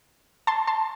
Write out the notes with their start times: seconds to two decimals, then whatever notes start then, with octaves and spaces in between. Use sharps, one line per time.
0.47 A5 C6
0.67 A5 C6